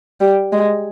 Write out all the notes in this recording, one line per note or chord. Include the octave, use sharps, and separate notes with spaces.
G3
G#3